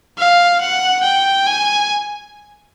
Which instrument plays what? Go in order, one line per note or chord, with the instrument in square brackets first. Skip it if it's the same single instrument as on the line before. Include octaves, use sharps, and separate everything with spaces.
[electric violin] F5
F#5
G5
G#5